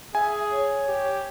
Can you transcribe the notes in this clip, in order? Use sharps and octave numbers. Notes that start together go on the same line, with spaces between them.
G#4 E5 G#5
C#5
G4